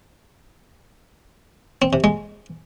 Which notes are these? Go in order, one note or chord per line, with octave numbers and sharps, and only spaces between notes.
C4
C3
G#3